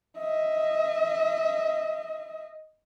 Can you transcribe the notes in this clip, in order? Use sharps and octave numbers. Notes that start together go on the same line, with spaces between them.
D#5 E5